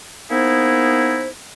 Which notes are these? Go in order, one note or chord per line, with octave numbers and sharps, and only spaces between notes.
A#3 B3 D#4 E4 G#4 C5